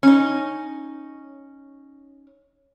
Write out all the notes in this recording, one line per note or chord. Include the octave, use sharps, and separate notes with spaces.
C#4 D#4